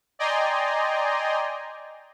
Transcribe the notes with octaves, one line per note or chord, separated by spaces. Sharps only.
D5 D#5 G5 G#5 A#5 C6